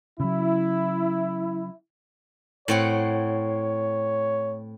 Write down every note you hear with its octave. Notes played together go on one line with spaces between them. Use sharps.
C#3 F#3 E4
A2 C4 C#5 F#5